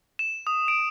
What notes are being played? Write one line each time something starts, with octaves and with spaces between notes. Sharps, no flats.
E7
D#6
D7